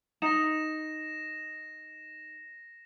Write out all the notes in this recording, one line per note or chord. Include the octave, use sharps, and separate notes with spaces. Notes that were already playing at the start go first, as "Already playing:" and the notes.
D#4 A#6 E7